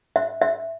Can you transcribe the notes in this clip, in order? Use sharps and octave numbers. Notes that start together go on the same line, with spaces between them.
E5
E5